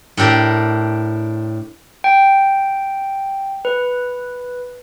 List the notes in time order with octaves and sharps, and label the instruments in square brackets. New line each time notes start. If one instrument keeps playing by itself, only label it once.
[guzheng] A2 D4 G4 A#4
[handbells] G5
B4